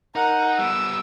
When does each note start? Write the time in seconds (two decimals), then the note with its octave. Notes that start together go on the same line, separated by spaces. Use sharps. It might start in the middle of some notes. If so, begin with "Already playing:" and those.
0.15 D#4 A#4 F#5
0.59 G3 B3 E6